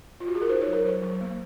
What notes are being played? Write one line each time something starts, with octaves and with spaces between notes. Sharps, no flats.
F4
F#4
G#4
A#4
D#4 C5
C#5
F#3
A#4
F#3 C5
F#3
A#3